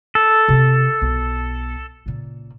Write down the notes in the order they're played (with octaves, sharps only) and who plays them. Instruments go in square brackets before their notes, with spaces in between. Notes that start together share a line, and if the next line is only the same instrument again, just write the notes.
[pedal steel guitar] A4
[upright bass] C3 F4
B1
A#2 C#3